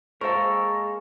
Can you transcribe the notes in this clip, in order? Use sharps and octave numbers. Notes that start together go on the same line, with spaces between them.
G#3 A#3 A4 A#4 C5 F5 C#6